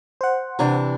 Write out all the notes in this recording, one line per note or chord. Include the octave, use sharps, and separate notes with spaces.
C5 F#5
C3 E3 D4